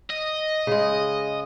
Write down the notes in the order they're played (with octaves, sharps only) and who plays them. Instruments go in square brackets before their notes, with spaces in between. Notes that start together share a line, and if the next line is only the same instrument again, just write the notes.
[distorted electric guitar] D#5
[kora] C#3 G#3